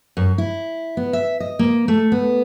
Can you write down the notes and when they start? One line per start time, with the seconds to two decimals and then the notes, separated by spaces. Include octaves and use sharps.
0.17 F#2
0.38 E4
0.97 B3
1.13 E5
1.40 D#5
1.59 A#3
1.88 A3
2.12 B3